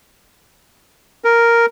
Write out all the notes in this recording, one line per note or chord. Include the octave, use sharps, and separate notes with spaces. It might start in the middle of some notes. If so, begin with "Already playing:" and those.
A#4